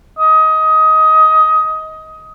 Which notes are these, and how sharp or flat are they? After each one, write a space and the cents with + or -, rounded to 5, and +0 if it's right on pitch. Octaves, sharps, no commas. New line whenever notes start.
D#5 +20